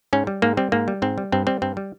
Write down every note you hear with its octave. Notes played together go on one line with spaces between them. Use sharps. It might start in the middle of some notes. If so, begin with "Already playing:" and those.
G#2 C#4
G3
G#2 A#3
G3 C4
G#2 A#3
G3
G#2 C4
G3
G2 C4
G3 C4
G2 C4
G3